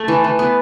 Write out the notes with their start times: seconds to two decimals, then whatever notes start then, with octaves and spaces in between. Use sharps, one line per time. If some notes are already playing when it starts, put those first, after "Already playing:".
Already playing: A3
0.08 E3
0.24 E3
0.39 B3